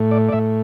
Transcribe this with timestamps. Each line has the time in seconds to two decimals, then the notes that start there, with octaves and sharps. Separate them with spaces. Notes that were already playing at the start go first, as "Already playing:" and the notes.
Already playing: A2 A3
0.11 D5
0.29 D5
0.32 A2 E5